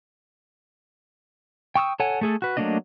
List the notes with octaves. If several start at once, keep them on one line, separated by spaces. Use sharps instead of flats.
G5 C#6 D#6 E6
A4 C#5 F#5 G#5
A3 G#4 A4
F#4 B4
F#3 A3 A#3 D4 D#5